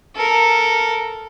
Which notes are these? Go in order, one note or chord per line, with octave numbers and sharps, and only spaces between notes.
A4 A#4